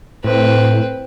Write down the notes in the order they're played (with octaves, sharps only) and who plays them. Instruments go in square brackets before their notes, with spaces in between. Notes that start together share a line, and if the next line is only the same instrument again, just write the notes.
[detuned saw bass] A2 [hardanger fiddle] C4 B4